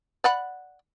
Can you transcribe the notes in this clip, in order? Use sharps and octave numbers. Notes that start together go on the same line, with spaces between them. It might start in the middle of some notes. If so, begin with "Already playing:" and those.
D5 F#5 B5